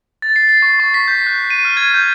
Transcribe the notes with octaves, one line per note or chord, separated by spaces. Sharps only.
A6
C7
C7
C#6
C#6
B6
G6
F#6
D#7
F6
G#6
G6